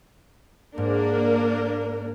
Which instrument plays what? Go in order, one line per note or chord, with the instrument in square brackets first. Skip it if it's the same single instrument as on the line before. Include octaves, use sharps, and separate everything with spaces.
[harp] G#2 [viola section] A#3 D4 A#4